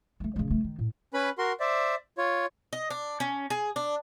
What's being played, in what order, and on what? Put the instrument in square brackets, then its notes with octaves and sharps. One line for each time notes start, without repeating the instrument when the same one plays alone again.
[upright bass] G#3 A3
C#3 G#3
F#3 A3
D#3
A2
[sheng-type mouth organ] C#4 B4 B5
F#4 A#4 C6
C5 D5 E5
F4 C#5
[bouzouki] D#5
D4
C#4
G#4
D4